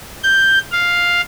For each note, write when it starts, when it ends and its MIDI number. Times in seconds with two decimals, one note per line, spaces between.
0.23 0.59 91
0.72 1.21 77